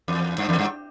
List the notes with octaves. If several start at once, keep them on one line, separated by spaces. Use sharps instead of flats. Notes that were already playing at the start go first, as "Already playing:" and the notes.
E2
G2
E2
G2